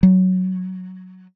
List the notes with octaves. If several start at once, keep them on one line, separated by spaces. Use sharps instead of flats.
F#3